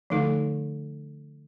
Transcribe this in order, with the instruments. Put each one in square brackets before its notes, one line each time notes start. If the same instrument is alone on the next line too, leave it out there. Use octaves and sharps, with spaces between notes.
[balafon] D3 F3 A3 D#4 A4